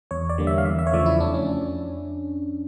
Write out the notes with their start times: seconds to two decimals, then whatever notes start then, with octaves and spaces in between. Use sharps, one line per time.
0.11 E2 C#5
0.29 D5
0.38 D3 G3 A#3
0.47 E5
0.58 F5
0.65 E2 E5
0.79 E5
0.87 C#5
0.93 C#3 F3 A3 D5
1.06 E4
1.20 F2 D4
1.34 C#4